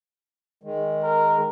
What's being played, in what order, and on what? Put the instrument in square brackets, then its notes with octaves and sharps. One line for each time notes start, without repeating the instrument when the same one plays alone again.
[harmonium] D#3 G#3
[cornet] A#4